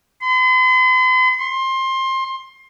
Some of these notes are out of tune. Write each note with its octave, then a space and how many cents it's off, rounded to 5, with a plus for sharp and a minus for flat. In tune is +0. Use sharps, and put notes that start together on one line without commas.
C6 -45
C6 +20